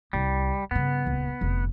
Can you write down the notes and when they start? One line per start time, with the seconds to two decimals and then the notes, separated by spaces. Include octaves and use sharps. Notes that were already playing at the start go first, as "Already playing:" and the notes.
0.13 C2 G3
0.71 G2 C#3 B3
1.05 D#1 C#2
1.41 F1 D3